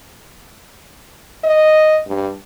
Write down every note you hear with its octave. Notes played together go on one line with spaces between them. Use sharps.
D#5
G2